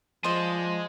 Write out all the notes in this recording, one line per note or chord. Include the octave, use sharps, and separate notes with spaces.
F3 G#4 C5 D5 D#5